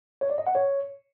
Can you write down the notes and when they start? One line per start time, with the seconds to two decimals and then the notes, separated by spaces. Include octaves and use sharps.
0.21 C#5
0.30 D5
0.38 D#5
0.47 F#5
0.55 C#5